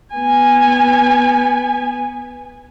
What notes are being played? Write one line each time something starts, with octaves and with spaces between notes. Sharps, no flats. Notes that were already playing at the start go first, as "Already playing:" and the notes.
B3 G#5